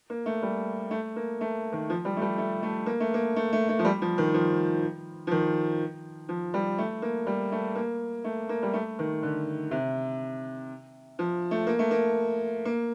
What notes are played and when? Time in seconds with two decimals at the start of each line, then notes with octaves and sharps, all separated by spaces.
0.10 A#3
0.26 A3
0.42 G3
0.91 A3
1.16 A#3
1.41 A3
1.73 D#3
1.90 F3
2.05 G3
2.17 A3
2.22 G3
2.38 A3
2.63 A3
2.86 A#3
3.00 A3
3.14 A#3
3.36 A3
3.53 A3
3.69 A3
3.79 F3
3.85 G3
4.02 F3
4.18 D#3
4.34 F3
5.27 F3
5.31 D#3
6.29 F3
6.54 G3
6.78 A3
7.02 A#3
7.27 G3
7.52 A3
7.75 A#3
8.24 A3
8.49 A#3
8.63 G3
8.74 A3
8.99 D#3
9.23 D3
9.71 C3
11.19 F3
11.51 A3
11.67 A#3
11.79 A3
11.91 A#3
12.65 A#3